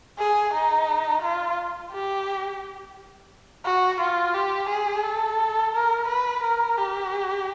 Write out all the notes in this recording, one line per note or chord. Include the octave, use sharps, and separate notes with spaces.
G#4
D#4
F4
G4
F#4
F4
G4
G#4
A4
A#4
B4
A#4
G4